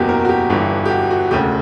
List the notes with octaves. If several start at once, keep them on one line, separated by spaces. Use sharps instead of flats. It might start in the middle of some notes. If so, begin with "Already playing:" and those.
Already playing: F#1 E2 B2 A#3 F#4 G4
A#4
F#4
G4
G1 G2 E3 G4
G4
F#4
F#4
E1 D2 C#3 G4